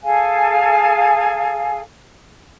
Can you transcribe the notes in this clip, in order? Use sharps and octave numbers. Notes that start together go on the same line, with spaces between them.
G#4 A4 F5 G#5